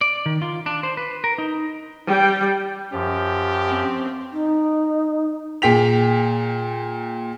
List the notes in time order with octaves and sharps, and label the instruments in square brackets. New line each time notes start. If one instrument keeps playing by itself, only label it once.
[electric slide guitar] D5
D#3
F4
D4
C5
B4
A#4
D#4
[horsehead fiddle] G3 G5
[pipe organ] F#2 F3 [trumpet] G4
[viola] C4
[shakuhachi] D#4
[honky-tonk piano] A#2 G#4 G5 B6 F7